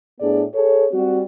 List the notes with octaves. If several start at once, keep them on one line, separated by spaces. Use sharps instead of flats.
A2 B3 D4 G#4 D5
G#4 A4 C#5
G3 C4 F#4